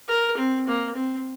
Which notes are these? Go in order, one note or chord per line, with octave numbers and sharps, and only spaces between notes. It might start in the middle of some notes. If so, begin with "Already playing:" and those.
A#4
C4
A#3
C4